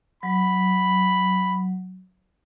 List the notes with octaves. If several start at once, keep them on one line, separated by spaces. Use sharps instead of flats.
F#3 B5